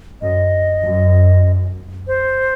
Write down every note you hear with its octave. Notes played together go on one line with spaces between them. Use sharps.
F#2 D#5
F#2
C5